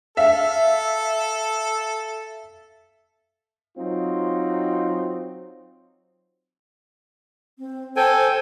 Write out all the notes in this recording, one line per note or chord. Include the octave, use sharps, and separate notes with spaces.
A4 E5 F5
F#3 C4 D#4 F4
C4
A4 C5 G5 G#5